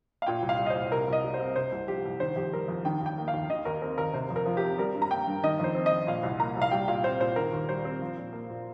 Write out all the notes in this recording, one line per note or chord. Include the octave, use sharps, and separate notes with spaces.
F5
A#2 G5
C2
F5
G3
D#5
C5
C2
C3 A#4
C2 D#5
G3
C5
C4
C3 C5
C2
F3 G4
C2
D#3 C5
F2 G4
G3 A#4
F2
D#3 G5
D#2
G5
A#3
F5
D#2
D#3 D#5
D#2 A#4
C4 A#4
D#2 A#4
C3 C5
F2
A#4
F3
G4
C4
G3 A#4
G2
A#5
A#3 G5
G2
D#3 D#5
F2 C5
C4
D#5
F2
A#2 F5
C2
A#3 A#5
C2
F5
G3 G5
A#2 F5
C4 C5
A#2 C5
D#3 A#4
D#2
G3 C5
C4
F3
A#2
A#3
A#2